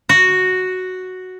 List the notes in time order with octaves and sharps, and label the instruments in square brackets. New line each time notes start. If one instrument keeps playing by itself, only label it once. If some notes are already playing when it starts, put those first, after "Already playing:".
[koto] F#4